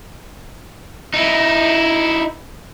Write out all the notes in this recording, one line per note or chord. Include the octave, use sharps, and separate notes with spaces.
D#4 E4